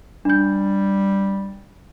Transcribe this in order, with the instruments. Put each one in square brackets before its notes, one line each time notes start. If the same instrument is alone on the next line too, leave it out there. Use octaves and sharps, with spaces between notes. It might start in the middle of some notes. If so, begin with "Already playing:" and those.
[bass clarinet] G3 [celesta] D4 G6